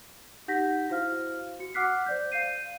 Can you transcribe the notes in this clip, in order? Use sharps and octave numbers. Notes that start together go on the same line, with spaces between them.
D#4 G4 F#5 G6 A#6 B6
E4 F#4 C5 F5 F6
F#4 C#7
F#5 D6 F6 F#6 B6 C7
C5 D5 G6
F5 G6 C7 D#7